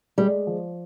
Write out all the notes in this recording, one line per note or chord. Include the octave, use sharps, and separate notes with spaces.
G3 G#3
F3